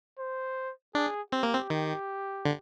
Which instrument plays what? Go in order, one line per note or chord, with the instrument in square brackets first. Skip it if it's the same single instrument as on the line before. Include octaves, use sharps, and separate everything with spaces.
[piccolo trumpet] C5
[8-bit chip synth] D4 [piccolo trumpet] G#4
[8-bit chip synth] C4 [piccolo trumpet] G4
[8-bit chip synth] A#3
C4
D#3
D3